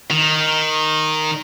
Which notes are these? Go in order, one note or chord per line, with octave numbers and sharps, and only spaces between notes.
D#3